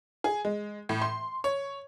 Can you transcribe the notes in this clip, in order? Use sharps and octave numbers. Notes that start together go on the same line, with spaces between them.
G#4
G#3
A2
C6
C#5